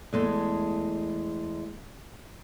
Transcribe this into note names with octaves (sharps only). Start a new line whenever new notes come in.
E2 G#3 A3